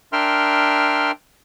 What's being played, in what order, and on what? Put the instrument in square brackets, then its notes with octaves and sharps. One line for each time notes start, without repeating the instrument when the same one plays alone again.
[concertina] D4 A#4 E5 G5 C6 F6